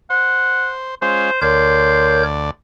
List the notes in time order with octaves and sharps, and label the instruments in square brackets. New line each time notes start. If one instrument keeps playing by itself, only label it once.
[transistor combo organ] C5 [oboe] F#5
[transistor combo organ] G#3 C#4 F4 [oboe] C5
[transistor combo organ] D2 D5 [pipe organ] A#4 C#5 G6 [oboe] C6